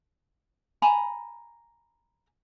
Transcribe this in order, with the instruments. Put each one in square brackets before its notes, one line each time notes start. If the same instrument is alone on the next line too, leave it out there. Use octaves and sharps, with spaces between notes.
[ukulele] G#5 A#5 B5